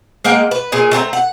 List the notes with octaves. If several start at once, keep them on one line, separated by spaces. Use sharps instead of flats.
G#3 A#3 F#5 G5
B4
A#2 G#4 G#5
A3 C4 A5 A#5
F#5